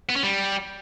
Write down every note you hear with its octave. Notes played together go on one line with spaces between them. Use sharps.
B3
C#4
G3